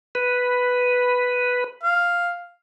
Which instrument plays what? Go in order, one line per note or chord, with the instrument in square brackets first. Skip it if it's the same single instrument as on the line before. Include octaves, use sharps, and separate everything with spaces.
[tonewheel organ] B4
[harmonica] F5